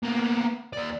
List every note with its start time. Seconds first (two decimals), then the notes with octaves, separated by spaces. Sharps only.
0.03 A#3 B3
0.73 D#2 D5